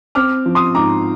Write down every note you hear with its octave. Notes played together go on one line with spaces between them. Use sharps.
C4 D6 F6
F3
C6 D#6
G#2 A#5 D6